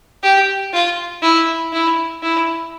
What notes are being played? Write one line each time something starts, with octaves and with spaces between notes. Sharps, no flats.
G4
F4
E4
E4
E4